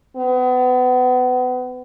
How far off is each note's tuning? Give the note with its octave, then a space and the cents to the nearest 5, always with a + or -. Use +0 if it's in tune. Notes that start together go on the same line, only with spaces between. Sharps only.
B3 +30